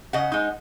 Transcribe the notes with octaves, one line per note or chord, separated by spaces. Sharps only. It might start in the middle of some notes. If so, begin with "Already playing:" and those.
C#3 D#5 F#5
G#3 D#4